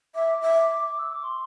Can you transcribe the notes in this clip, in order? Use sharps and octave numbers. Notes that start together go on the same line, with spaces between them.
E5 D6
E5
E6
D6
C6